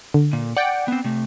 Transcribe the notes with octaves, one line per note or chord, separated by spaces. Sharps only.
D3
A#2
D5 F#5 G5
B3 C4
C3 A3